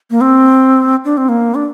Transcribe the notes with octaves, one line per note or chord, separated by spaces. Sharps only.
A#3
C4
D4
C4
A#3
D4